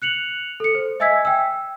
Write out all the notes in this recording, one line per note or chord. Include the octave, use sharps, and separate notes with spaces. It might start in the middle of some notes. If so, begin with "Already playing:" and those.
F#6 C#7 F7 F#7
A4 C#7
C5
D#5 E5 G#5 E6 G#6 B6
G5 E6